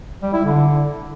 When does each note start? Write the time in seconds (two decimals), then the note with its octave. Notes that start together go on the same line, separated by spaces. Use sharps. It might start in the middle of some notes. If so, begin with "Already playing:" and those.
0.22 G3
0.33 E4
0.44 D3